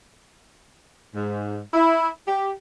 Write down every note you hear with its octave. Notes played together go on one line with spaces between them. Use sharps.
G#2
E4
G4